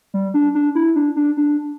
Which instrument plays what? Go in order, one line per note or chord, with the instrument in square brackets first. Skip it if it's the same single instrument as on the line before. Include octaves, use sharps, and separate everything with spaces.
[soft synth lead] G3
D4
D4
E4
D4
D4
D4